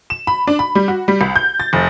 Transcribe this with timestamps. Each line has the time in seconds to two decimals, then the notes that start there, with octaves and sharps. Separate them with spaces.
0.10 E7
0.27 B5
0.47 D4
0.59 B5
0.75 G3
0.88 F#4
1.08 G3
1.21 C2
1.36 G6
1.60 A6
1.73 F1